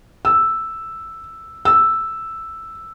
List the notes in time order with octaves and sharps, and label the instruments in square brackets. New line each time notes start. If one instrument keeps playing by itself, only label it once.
[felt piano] E6
E6